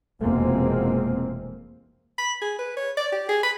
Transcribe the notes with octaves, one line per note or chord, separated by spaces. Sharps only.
F1 E2 B2 G#3 A#3 C4
B5
G#4
B4
C#5
D5
G4
G#4
B5